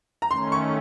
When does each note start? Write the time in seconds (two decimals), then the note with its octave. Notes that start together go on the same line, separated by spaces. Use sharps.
0.22 A#5
0.30 D#3 A3 C#4 C6
0.52 C#6